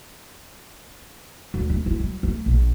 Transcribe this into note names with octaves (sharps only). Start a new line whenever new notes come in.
D2
A3
E4
F#3
A3
A#1